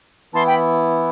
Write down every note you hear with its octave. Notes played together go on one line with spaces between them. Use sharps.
E3 B3 E4 A5 C6
G5 B5